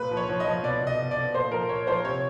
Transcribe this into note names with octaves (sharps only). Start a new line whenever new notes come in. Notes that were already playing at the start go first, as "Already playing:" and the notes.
Already playing: A#2 B4
F3
C#5
F3
D#5
F3
B2 D5
B2
D#5
B2
B2 D5
A#2 C5
F3 A#4
A#2 C#5
F3 C5
C3 C#5